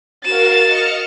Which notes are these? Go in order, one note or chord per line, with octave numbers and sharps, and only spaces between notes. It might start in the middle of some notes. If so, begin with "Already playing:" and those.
F#4 A#4 F5 A6 E7
D#5 F6 C#7